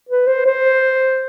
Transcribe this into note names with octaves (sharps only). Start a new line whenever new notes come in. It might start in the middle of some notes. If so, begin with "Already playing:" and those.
B4
C5
C5